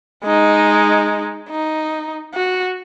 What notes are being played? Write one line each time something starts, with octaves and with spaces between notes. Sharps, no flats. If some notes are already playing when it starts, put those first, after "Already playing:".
G#3 D#4
D#4
F#4